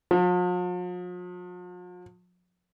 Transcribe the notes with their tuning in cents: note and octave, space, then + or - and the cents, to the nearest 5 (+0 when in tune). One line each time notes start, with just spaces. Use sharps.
F3 +45